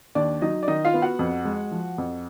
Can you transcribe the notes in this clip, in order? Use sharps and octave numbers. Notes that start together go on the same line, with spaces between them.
D#2 D4 D5
F#3 D#4 D#5
D5
D#3 D#4 D#5
F4 F5
B3
F#4 F#5
F2
G#3
F3
F2